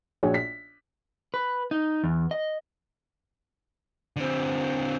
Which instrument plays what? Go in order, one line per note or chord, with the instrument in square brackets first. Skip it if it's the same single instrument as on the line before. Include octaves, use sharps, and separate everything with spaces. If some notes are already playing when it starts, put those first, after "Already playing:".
[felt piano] A#1 F#4 G#4 C#5 G#5
B6
[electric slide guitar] B4
D#4
E2
D#5
[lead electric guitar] D3 C4